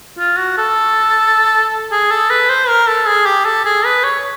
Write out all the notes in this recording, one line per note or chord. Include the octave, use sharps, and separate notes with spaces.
F4
F#4
A4
G#4
A4
B4
C5
A#4
A4
G#4
G4
A4
G#4
B4
C#5